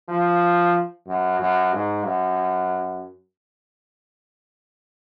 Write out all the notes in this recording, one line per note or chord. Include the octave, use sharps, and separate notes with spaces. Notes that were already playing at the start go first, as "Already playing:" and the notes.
F3
F#2
F#2
G#2
F#2